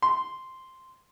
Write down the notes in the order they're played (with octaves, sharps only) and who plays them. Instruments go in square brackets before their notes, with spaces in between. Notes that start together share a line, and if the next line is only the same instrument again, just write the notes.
[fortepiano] C6